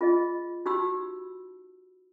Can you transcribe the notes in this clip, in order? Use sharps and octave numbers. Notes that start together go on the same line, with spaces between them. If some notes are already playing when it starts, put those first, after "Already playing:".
F4 G#4 D#5
D#4 F#4 G4 B5 E6